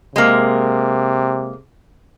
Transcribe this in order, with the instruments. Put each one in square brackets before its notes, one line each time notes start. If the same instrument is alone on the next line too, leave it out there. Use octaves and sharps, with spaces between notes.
[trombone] C3 [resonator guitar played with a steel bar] G#3 A#3